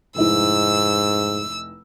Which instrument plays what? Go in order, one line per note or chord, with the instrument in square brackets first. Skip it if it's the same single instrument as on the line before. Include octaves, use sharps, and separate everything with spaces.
[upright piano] F1 D#4 E4 [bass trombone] G#2 [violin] E6